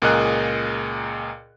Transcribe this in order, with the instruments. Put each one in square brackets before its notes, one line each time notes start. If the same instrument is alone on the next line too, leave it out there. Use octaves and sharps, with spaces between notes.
[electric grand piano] C#2 A#2 G#4 A#4 D#5 F#6